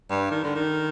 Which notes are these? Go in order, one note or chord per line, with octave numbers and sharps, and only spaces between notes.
G2
D#3
D3
D#3